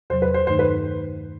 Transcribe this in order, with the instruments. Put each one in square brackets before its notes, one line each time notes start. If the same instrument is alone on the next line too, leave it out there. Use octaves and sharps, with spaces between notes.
[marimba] E2 C3 F#3 [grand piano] C5
[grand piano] B4
C5
[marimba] G2 D#3 A3 D#4 [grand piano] C5
[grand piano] B4